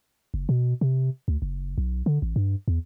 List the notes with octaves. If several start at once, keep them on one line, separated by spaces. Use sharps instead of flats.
F#1
B2
C3
D2
F#1
B1
D3
A1
G2
E2